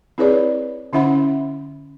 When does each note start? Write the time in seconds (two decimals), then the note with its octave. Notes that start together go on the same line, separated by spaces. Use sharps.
0.18 C4 E4 G#4 B4 C#5 D5
0.93 D3 C#4 E4 E5 F#5 B5